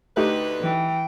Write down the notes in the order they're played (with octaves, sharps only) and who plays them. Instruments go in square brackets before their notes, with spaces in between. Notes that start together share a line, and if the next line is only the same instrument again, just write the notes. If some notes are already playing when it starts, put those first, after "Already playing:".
[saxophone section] D2 D3 B4 [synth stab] A3 G4 [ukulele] D#4
[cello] E3 G5